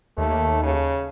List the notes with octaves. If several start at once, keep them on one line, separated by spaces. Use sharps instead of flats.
D#2 A3
C#3